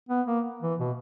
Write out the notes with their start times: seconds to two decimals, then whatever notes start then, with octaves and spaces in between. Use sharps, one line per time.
0.09 B3
0.27 A#3
0.62 E3
0.79 B2